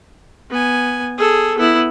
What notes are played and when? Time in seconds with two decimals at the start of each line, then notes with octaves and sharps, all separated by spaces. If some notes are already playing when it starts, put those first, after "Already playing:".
0.50 B3 G#5
1.18 G#4 A4
1.58 B3 E4